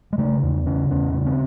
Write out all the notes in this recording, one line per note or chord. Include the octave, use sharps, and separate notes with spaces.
G#3
C#3 A3
E2
C#3 C#4
E2 C#4
C#3
C4